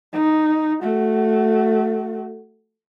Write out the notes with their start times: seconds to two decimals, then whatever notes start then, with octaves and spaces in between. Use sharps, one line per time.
0.13 D#4
0.82 A3 F#4